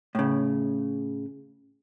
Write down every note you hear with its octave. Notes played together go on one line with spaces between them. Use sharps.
A2 C#3